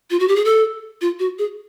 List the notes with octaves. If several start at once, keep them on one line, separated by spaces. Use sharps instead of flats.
F4
F#4
G4
G#4
A4
F4
F#4
G#4